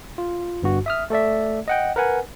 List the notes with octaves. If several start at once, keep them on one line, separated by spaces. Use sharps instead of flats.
F4
G1 G2 F#4
E5 D#6 F6
A3 A4 D5 E5
D#5 F#5 G5
A#4 B4 F#5 G#5